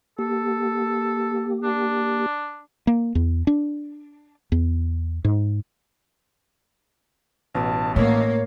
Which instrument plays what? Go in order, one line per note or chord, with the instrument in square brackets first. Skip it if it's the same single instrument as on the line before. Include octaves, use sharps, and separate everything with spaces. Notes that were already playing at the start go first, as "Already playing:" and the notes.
[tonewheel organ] A#3 G4 [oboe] A4
[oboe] D4
[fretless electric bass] A#3
E2
D4
E2
G#2
[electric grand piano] A1 B2 [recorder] A5
[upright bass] A2 [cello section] A#3 [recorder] C#5